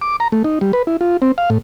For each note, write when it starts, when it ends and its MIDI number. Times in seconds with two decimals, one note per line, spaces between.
0.02 0.16 86
0.20 0.28 82
0.32 0.43 57
0.44 0.59 63
0.61 0.72 55
0.73 0.82 71
0.87 0.97 64
1.01 1.17 65
1.22 1.32 60
1.38 1.50 77
1.50 1.58 45